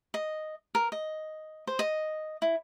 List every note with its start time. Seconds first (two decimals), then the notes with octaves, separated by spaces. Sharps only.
0.14 D#5
0.75 A#4
0.92 D#5
1.67 C5
1.79 D#5
2.42 E4